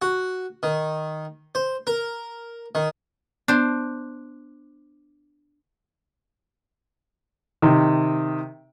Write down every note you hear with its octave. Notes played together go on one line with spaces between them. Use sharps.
F#4
D#3
C5
A#4
D#3
B3 D4 C5
C3 D#3